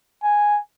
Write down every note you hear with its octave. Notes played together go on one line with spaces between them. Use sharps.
G#5